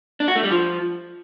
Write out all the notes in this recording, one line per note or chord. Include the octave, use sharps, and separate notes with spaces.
D4
F#4
A3
G3
F3